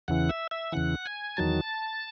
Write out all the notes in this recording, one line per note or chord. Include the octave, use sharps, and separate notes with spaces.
E2 C#3 E3 F#5
E5
E5
E2 C#3 E3 F#5
G#5
E2 D#3 F#3 A5